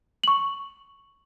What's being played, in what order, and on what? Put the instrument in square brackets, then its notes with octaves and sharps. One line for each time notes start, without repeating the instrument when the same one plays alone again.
[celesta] C#6 F#7